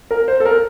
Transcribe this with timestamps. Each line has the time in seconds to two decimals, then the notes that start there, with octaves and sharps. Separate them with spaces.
0.11 A#4
0.28 C5
0.40 A4
0.45 A#4